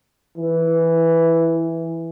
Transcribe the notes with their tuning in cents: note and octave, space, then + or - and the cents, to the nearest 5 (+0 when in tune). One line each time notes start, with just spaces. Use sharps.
E3 +0